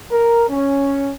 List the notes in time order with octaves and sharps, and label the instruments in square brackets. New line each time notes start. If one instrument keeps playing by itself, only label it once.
[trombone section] A#4
C#4